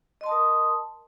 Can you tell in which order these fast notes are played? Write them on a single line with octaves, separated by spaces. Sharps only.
D#5 C6 A5 D#6 A#4